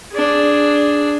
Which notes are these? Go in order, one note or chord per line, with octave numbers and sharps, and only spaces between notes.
D4 G#4